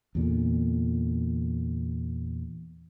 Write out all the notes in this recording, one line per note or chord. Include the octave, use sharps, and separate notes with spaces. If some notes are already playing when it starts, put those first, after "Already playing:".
E2 A#2 D3